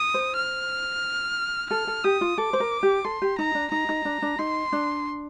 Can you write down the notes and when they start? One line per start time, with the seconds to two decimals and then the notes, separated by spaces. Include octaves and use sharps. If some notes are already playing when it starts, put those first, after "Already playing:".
Already playing: D#6
0.14 C5
0.36 F6
1.70 A4 F6
1.87 A4
2.04 G4 D#6
2.21 F4
2.38 A4 D6
2.53 C5
2.60 A#4
2.83 G4
3.05 A4 C6
3.22 G4
3.38 D#4 A#5
3.55 D4
3.72 D#4 A#5
3.89 D#4
4.05 D4
4.22 D4
4.39 D#4 C6
4.73 D4